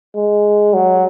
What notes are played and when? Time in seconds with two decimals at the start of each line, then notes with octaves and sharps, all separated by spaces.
0.15 G#3
0.74 F#3